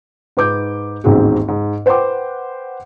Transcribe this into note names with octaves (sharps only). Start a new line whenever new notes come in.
G#2 B4 D6 G6
A1 D#2 G#2 C4 F#4 G#4
G#2
B4 C5 F#5 G5 C6 D6